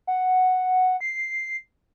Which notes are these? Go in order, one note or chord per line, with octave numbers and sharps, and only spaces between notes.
F#5
C7